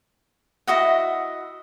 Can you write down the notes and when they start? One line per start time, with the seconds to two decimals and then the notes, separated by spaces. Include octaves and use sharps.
0.67 E4 F#4 D#5 F#5